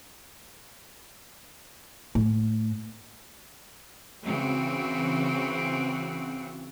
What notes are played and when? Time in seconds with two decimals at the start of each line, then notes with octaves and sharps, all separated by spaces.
2.15 A2
4.25 C#3 E3 C4 F#4